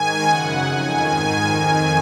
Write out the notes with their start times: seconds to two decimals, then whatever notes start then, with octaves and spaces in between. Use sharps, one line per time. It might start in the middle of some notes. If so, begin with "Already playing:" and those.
Already playing: G#2 D#3 G#5
0.24 F#2 C#3 F#5
0.64 F2 D#3 G#5
1.05 G#2 D#3
1.46 F2 D#3 G#5